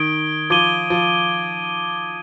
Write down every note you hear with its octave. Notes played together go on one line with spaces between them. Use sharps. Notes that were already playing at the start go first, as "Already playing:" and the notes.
Already playing: D#3 D#6 G#6 D7 G7
F3 D6 G#6 D#7 G7
F3